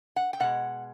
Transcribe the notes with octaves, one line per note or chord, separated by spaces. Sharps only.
F#5
G5
B2 G#3 F#5